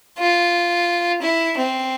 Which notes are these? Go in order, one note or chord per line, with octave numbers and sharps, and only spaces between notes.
F4
E4
C4